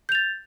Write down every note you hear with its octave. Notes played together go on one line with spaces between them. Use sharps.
G6 A6 F7